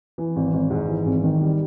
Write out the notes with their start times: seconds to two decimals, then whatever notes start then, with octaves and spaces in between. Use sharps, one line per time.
0.18 E3
0.36 G#1
0.53 G#1
0.70 G#2
0.88 E3
1.06 G#1
1.24 D#3
1.41 G3